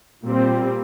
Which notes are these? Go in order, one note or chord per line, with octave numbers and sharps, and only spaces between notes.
A#2 G3 C4